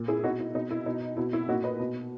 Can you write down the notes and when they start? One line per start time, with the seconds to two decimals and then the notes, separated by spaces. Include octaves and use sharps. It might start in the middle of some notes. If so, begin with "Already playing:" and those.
Already playing: A#2
0.08 E4 G#4
0.23 B2 D#4 F#4
0.40 E4
0.55 B2 D#4
0.71 E4
0.86 B2 D#4
1.17 B2 E4
1.33 E4
1.48 A#2 D#4 F#4
1.64 B4 D#5
1.80 B2